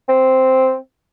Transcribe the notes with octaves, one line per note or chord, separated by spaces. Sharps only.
C4